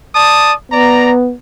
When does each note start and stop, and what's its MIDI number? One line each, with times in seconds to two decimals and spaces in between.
0.15 0.52 74
0.15 0.52 81
0.15 0.52 87
0.72 1.34 59
0.72 1.12 74
0.72 1.12 82